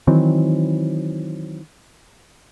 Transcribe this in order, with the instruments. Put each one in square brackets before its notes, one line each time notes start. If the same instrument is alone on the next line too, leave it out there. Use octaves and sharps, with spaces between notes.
[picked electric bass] D#3 E3 F#3 C4